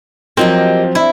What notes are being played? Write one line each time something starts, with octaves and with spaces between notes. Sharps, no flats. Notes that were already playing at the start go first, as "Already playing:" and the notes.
F3 F#3 A#3 C4 D#4 G4
E4